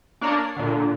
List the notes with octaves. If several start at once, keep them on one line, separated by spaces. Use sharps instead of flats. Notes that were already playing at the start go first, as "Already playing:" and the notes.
A#3 D4 A#4 C#5 D5 D#6
C7
A#2 D3